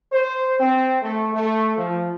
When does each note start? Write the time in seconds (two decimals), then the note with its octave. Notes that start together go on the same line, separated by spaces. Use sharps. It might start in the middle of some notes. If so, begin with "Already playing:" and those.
0.12 C5
0.60 C4
1.02 A3
1.34 A3
1.77 F3